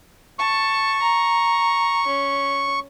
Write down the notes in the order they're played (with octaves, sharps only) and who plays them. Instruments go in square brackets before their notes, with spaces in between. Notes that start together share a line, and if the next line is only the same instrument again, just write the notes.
[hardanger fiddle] A5 [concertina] C#6
[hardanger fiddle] A#5
C#4